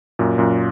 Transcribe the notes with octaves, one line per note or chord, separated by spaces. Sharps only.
F#2 A#2
F#2 A#2